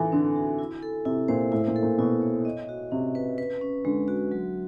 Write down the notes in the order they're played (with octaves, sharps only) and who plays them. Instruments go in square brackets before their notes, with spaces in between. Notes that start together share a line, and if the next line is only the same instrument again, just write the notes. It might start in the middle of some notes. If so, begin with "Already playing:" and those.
Already playing: [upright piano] E3 [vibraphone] D#4 A4
[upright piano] D3 [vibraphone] C4
[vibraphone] F#4
E4
A4
[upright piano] C3 [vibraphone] E4
[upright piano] A#2 [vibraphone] C5
[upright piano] A2 [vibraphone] E4
[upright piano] A#2
[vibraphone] A4
[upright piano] A#2
[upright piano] B2 [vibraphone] E4
[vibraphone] C#5
D#5
F#4
[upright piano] C3 [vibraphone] C#4
[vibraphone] B4
B4
C#4
[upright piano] D3 [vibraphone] G#3
[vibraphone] F#4
F#3